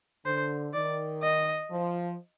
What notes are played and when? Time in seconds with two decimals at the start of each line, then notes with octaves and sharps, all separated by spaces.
0.26 D3 C5
0.74 D#3 D5
1.22 D#5
1.71 F3